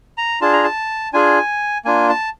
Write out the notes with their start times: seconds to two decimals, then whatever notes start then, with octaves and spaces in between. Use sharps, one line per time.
0.18 A#5
0.41 D4 F4 G#4 A5
0.53 A#5
0.64 A5
1.13 D4 F4 G#4 G#5
1.85 A#3 D4 F4 G#5
2.09 A5